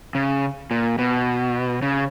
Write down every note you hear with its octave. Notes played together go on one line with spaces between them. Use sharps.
C#3
A#2
B2
C#3